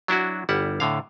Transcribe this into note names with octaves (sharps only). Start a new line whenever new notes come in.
F#3 D4 E4 F#4
G1 G3 E4 F#5
A2 D3 F5